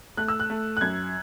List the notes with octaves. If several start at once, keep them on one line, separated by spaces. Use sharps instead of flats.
A3 F#6
E6
F#6
A3
F#6
F#2 G#6